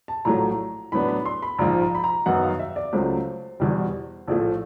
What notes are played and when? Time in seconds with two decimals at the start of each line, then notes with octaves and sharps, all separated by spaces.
0.08 A5
0.25 A#1 A2 F#3 A3 A#5
0.92 A2 F#3 B3 D4 B5
1.09 B5
1.26 C6
1.42 B5
1.58 A#1 G#2 F3 A#5
1.82 A#5
1.95 B5
2.04 A#5
2.26 F#2 D#3 F#3 B3 D#4 F#5
2.43 F5
2.60 E5
2.76 D5
2.93 C#2 C#3 F#3 A3 C5
3.60 E2 B2 G3
4.27 A#1 A2 F3 A3